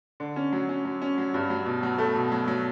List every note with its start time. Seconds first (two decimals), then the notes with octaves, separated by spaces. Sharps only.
0.20 D3
0.36 C#4
0.52 F#3
0.69 C#4
0.85 F#3
1.02 C#4
1.18 F#3
1.34 G2
1.50 F#3
1.66 B2
1.83 F#3
1.98 A3
2.15 B2
2.32 F#3
2.48 F#3